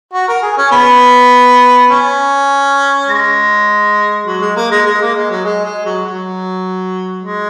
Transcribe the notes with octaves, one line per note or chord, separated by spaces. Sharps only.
F#4
A#4
G#4
C#4
B3
C#4
G#3
F#3
G#3
A#3
G#3
G#3
A#3
G#3
F#3
G#3
G#3
F#3
F#3
G#3